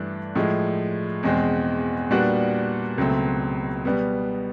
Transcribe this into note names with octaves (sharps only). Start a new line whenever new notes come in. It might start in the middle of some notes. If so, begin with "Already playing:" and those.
Already playing: G2 E3 A3 D4
A2 F3 G#3
E2 B2 G#3 C4
A#2 G3 B3 D4 F#4
C#2 B2 F#3 A3 C4
B2 G3 B3